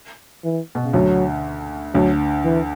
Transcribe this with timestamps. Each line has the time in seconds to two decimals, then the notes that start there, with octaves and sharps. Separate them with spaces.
0.44 E3
0.75 B2
0.84 C#3
0.94 D2 D3 F#3
1.95 D2 D3 F#3
2.45 E3